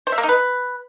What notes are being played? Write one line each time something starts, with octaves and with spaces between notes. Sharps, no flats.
C5
E5
A#3
D#4
B4